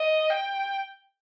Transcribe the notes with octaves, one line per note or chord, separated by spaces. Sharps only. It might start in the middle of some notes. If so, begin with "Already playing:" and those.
Already playing: D#5
G5